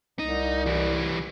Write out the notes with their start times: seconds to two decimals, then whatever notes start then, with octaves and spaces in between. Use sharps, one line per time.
0.19 C2 D#4
0.66 E3 G3